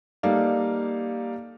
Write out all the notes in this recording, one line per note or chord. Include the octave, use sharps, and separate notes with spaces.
G3 A#3 D#4 A4 D5 F5